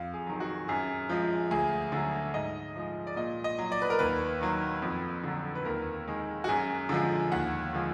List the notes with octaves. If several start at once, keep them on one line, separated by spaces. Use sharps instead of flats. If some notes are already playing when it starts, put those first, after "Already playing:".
Already playing: F2 F5
G#4
D#3 F#3
F#4
F#2 G#4
F3 G#3
D2 G#4
D3 F#3
G#2 D#5
F3 G#3
D5
A#2 D#5
D#5
F#3
D5
B4
A#4
D#2 B4
D#3 F#3
F2
D3 F#3
B4
D#2 A#4
D#3 G#3
F#4
F#2 G#4
D3 F3 G#3
D#2 F#5
D3 F3 G#3